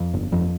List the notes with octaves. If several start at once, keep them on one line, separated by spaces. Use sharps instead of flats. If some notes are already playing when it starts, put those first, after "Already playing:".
Already playing: F2
G1
F2